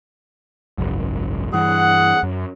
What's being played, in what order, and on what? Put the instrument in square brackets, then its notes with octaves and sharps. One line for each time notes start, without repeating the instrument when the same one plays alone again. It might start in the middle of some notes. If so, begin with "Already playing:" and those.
[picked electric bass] G#1 C#2 F#2
[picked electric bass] G2 E3 [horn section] G#4 F#5
[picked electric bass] F#2